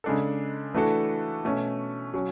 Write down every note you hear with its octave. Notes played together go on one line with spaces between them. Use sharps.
C#3 G#3 D4 A4
E3 A3 D4 F#4 A4
B2 A3 C#4
F#3 C#4